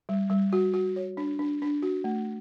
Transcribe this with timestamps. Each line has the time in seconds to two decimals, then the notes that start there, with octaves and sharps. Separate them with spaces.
0.09 G3
0.30 G3
0.53 F#4
0.74 F#4
0.96 C#5
1.17 D4
1.39 D4
1.62 D4
1.82 F#4
2.04 A3